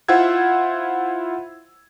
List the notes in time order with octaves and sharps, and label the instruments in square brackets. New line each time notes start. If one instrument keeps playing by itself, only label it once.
[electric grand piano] E4 F4 C5 F#5 E6 G#6